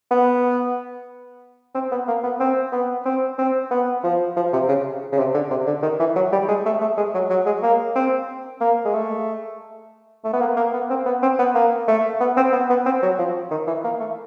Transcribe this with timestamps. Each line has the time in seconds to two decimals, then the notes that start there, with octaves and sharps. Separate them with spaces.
0.11 B3
1.75 C4
1.91 B3
2.08 A#3
2.23 B3
2.40 C4
2.72 B3
3.06 C4
3.38 C4
3.71 B3
4.04 F3
4.37 F3
4.53 C3
4.68 C#3
5.12 C#3
5.18 C3
5.34 D3
5.51 C3
5.67 D3
5.83 D#3
6.00 E3
6.16 F#3
6.32 G3
6.48 G#3
6.65 A3
6.81 A3
6.97 G#3
7.14 F#3
7.30 F#3
7.46 G#3
7.63 A#3
7.96 C4
8.61 A#3
8.85 G#3
8.94 A3
10.24 A3
10.33 B3
10.41 A#3
10.57 A#3
10.73 B3
10.90 C4
11.06 B3
11.22 C4
11.39 B3
11.55 A#3
11.88 A3
12.20 B3
12.37 C4
12.53 B3
12.70 B3
12.86 C4
13.02 F#3
13.18 F3
13.51 D#3
13.67 E3
13.84 A#3
14.00 A3